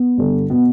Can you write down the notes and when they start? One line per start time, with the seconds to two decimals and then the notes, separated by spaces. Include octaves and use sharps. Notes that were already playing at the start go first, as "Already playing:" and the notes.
Already playing: B3
0.18 G2 D3
0.50 B2 B3